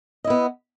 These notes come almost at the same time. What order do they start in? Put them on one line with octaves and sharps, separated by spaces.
D#5 E4 B3